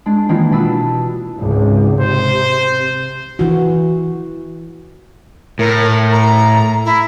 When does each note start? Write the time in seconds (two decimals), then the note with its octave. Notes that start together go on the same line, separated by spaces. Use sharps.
0.06 G#3 D4
0.29 D#3 E3 A#3 D4 E4 F4
0.51 B2 D4 B4 A5 E6 E7
1.38 G#1 C#2
2.01 C3 C5
3.39 E3 F#4
5.59 A2 A#4
6.12 A#5
6.85 E4